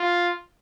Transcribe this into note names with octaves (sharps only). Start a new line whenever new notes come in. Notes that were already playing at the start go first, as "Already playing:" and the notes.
Already playing: F4